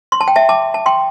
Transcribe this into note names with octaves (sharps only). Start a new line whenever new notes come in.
C6
A5
G5
E5 A5
A5 D6
A5
G5 C6